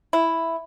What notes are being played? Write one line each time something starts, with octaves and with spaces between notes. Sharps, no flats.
E4